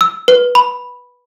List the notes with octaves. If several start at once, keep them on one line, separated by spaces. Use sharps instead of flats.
E6
B4
B5